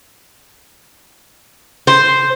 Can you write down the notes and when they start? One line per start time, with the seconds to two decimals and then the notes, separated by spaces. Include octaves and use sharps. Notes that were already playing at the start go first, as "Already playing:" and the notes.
1.87 C5